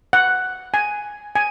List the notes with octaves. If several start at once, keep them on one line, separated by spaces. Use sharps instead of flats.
F#5
G#5
G#5